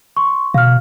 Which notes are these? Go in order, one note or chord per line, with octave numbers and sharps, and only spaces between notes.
C6 C#6
B2 F5 F6